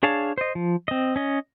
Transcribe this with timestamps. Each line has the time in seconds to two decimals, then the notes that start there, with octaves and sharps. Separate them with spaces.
0.03 D4 G#4 C#5 F5 A5
0.38 C5 D#5
0.55 F3
0.88 C4 D#5
1.16 C#4 D#5